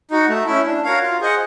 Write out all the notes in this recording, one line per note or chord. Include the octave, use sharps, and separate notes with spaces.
D#4 F#4
A3
C#4 E4
D4
F#4 A#4 C#5 F5
F4
G#4 C5 D#5 F#5